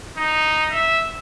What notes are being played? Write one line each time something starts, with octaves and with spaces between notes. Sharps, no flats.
D#4
E5